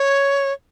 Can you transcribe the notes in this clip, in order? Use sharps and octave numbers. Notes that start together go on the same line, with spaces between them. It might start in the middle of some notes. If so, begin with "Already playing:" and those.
Already playing: C#5